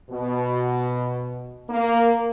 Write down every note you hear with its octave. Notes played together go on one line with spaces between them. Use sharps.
B2
A#3